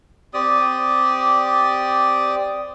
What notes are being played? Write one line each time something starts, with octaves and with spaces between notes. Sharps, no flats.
C4 G4 D5 D#6